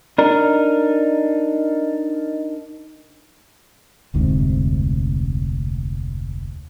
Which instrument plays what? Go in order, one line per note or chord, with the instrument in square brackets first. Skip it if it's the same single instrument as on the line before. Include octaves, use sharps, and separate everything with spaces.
[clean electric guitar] D4 D#4 A#4
[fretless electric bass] F1 D2 G#2 C3